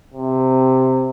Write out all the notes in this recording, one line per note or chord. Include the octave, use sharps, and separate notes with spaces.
C3